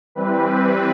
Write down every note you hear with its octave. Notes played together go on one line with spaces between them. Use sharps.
E3 G3 C4 B4